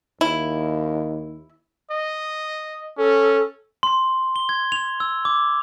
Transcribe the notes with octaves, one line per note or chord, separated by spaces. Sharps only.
D#2 E4
D#5
C#4 A4
C6
G7
G#6
F7
E6
D6